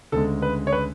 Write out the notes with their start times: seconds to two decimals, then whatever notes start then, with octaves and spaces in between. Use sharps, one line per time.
0.12 D2 C#3 G#3 A4
0.42 B4
0.67 C#5
0.72 B4